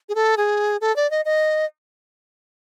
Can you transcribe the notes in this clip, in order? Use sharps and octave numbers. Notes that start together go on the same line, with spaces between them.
G#4
A4
G#4
A4
D5
D#5
D#5